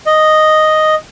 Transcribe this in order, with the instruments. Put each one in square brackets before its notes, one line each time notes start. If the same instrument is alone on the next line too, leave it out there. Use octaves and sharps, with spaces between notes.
[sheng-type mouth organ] D#5